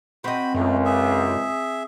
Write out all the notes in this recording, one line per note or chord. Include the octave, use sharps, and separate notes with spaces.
C4 F#4 D#5 B5
C#2 F#2 A3
G#4 E5